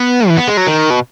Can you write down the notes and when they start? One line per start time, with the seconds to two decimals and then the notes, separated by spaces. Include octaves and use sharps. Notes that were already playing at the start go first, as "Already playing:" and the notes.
Already playing: B3
0.28 E3
0.37 B3
0.47 G#3
0.57 F#3
0.67 D#3
0.90 B2